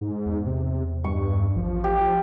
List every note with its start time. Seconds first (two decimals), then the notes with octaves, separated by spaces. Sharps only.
0.01 G#2
0.26 E2
0.46 C3
1.04 G2 C#6
1.56 A1 F3
1.84 G4